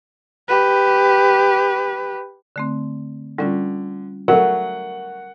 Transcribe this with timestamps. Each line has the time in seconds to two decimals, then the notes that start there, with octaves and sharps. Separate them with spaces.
0.48 G4 B4
2.56 D3 A3 C4
3.38 D3 G3 C#4 F4
4.28 F#3 A3 A#4 F#5